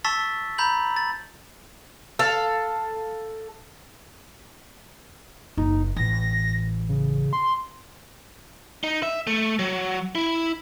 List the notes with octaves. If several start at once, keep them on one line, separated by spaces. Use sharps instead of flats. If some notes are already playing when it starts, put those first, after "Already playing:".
A5 C#6 E6 A6 B6
A#5 B5 G6 F#7
A6
A4 F5
F#1 D#4
A1 A#6
C#3
C6
D#4
E5
A3
F#3
E4